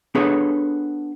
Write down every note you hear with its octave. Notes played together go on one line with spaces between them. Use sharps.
B3 D4 G#4 A4 B4 C#5